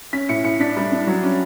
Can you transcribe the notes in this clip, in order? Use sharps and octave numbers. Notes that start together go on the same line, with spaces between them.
C#4 B6
A2 C#7
A2 C#7
D4 B6
G3
D4
F#3
C#4